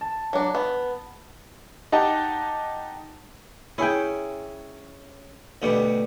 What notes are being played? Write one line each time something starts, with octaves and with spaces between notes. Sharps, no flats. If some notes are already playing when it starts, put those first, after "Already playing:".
A5
F#3 D4
B3
D#4 G4 D#5 F#5 A5
C#4 E4 G#4 G5
D2 B2 G3